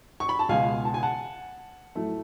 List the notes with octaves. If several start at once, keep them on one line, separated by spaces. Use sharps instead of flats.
C#6
B5
A5
C#2 B2 G#3 F5 G#5
A5
G#5
F#5 A5
A2 F#3 A3